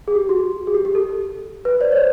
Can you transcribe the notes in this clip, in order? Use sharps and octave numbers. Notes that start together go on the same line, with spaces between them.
G#4
G4
F#4
G#4
G4
G4
A4
B4
C5 D5
C#5
C5 D5